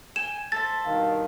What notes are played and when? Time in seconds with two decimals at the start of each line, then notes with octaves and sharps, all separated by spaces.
0.16 G5 G#5 E7
0.52 A4 C5 E5 A6
0.86 G2 B2 D#3 F5